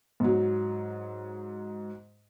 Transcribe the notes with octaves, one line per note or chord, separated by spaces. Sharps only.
G#2 F#3